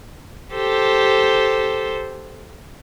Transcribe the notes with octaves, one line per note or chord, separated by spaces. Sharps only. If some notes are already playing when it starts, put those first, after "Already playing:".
G4 A4 C5